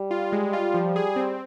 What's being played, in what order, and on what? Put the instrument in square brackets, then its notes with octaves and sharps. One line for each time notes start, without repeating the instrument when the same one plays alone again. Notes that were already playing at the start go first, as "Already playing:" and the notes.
Already playing: [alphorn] G3
[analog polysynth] F4
G#3
F4
F3
G#4
C4